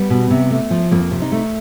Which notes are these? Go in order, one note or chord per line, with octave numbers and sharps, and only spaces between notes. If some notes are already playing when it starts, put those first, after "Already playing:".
Already playing: G3 B3
B2
C3
A3
F3
F2 A#3
C3
D#4
A3